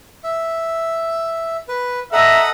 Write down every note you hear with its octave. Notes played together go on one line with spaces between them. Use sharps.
E5
B4
A4 D#5 E5 F#5 A#5